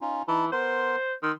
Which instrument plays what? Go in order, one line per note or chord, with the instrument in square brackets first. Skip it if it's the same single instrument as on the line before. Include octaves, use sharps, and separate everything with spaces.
[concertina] C#4 D#4 F4
[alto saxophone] E3 [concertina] D#4 A5 B5
[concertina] B3 A#4 C6 [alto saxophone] C5
[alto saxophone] D#3 [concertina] C6 E6